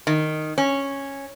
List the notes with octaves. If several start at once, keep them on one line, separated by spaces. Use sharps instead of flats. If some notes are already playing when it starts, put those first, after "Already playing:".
D#3
C#4